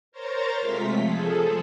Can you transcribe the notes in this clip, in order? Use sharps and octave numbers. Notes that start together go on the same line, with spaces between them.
A#4 C5 C#5 A#5 A6
C3 G#3 A3 F4 B6
F3 G#4 A4